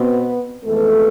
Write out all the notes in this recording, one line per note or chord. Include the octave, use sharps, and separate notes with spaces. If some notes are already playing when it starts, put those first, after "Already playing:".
Already playing: B2 B3 C4 B4
F2 E3 G#3 A3 B3 A4